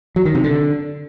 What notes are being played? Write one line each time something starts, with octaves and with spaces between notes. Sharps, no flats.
F#3
D#3
C3
D3